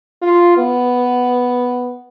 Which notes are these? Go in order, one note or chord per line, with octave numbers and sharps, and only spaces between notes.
F4
B3